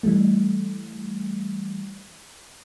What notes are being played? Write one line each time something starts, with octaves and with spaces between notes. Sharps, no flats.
E3 G3 A3